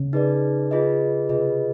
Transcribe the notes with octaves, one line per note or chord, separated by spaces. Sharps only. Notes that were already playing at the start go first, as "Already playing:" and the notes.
Already playing: C#3
D#4 G#4 B4 D5
F4 G#4 B4 D#5
C3 F4 G#4 B4 D#5